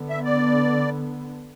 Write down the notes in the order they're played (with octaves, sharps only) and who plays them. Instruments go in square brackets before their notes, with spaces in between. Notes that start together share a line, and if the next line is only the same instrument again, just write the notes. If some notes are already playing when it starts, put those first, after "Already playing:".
Already playing: [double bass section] D3 B3
[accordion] E5
D5